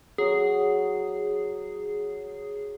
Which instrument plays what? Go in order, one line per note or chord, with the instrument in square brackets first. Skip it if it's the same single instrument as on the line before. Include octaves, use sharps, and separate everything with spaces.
[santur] F#3 [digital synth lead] G#4